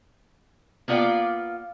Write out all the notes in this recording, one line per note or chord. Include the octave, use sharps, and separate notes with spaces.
A#3 B3 F4 D5 F5 G5